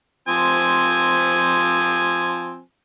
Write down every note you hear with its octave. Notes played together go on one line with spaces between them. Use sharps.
F3 C4 G#5